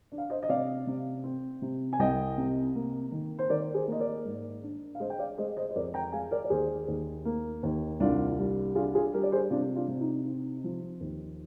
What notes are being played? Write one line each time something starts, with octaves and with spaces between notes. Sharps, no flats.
D4
F5
C5 D#5
D#5
C3 D5 F5
C3
C4
C3
G#5
C2 D#5 G5
C3
A#3
D#3
C5
D#3 A#4 D5
G#4 C5
A#3 D#5
A#4 D5
G#2
D4
F5
G#3 C5 D#5
G5
D5 F5
G#3 C5 D#5
C5 D#5
C5
F2 A#4 D5
G5 A#5
G#3 F5 G#5
A#4 D5
D5
D#2 G#4 C5
D#2
A#3
D#2
C2 D4 F4
G3
D4 F4 G#4
F4 G#4
G3 G4 A#4
D5
G#4 C5
C3 D4 F4
D4 F4
C3
D#4
C4
F3
D#2